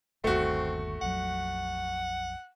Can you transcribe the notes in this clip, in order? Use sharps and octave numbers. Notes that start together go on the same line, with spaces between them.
G1 D#2 A3 C4 F#4
A#1 F2 F#3 F#5